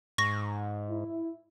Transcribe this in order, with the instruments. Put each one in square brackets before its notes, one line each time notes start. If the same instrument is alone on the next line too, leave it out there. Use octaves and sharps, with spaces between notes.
[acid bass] G#2 [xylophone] C#6 A#6
[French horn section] E4